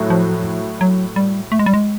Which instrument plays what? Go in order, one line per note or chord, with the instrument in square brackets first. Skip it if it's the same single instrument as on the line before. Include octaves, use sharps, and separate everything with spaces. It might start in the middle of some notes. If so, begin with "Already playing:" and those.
Already playing: [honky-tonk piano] A2 F#3 A3
[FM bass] F3
F#3
G3
A3
G#3
G3
G#3